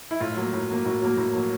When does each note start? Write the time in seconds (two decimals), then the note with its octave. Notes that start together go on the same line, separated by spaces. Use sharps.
0.11 E4
0.20 A2 F4
0.37 F#3 A#3
0.53 A2
0.69 F#3 A#3
0.85 A2 F#4
1.02 F#3 A#3
1.17 A2
1.33 F#3 A#3